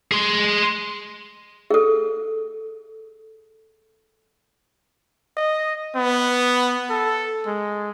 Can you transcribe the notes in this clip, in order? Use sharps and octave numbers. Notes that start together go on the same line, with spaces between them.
G#4 C6
G#4 A4
D#5
B3
A4
G#3